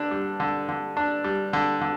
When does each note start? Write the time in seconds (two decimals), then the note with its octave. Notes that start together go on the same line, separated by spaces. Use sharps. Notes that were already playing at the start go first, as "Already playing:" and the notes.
Already playing: D3 D4
0.11 G3
0.40 D3
0.69 D3
0.97 D4
1.24 G3
1.53 D3
1.81 D3